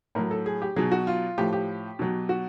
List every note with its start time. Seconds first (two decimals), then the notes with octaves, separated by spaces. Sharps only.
0.15 A2 F#3 A#4
0.31 A4
0.46 G#4
0.62 G4
0.76 B2 F#3 G#4
0.91 F#4
1.07 F4
1.38 A2 F3 G4
1.53 G4
1.99 B2 F#3
2.29 F#4